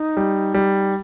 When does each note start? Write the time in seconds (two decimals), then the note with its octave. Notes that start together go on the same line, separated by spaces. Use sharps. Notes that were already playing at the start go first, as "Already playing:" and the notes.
Already playing: D#4
0.17 G3
0.54 G3